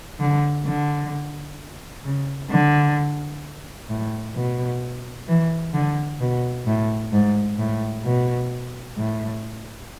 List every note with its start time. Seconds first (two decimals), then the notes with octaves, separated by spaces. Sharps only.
0.20 D3
0.66 D3
2.05 C#3
2.51 D3
3.90 A2
4.35 B2
5.28 E3
5.74 D3
6.20 B2
6.67 A2
7.13 G#2
7.59 A2
8.05 B2
8.97 A2